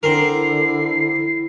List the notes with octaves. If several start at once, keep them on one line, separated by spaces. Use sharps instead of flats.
D3 C4 E4 A#4 C7